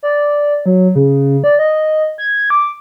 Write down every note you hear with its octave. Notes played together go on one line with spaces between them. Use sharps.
D5
F#3
C#3
D5
D#5
G#6
D6